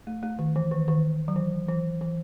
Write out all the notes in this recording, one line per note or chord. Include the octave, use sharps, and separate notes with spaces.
A3
A3
D#3
E3
D#3
D#3
F#3
E3
E3
E3